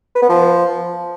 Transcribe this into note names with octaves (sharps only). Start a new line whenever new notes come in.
B4
B3
F3